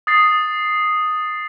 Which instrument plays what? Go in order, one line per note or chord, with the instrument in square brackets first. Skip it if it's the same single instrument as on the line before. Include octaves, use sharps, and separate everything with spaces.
[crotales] D#6 A6 C7